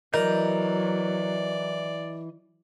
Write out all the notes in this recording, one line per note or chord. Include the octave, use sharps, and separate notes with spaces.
E3 F#3 A#4 D5 D#5 G6